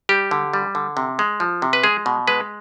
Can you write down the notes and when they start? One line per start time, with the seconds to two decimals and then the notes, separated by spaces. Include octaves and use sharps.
0.09 G3 G4
0.31 D3
0.54 G3
0.75 D3
0.97 C3
1.19 G#3
1.40 F3
1.62 C3
1.73 B4
1.83 G#3 G#4
2.06 B2
2.28 G#3 B4